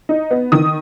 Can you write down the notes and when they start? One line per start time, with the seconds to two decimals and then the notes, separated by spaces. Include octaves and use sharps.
0.09 D#4
0.31 B3
0.52 D#3 D#6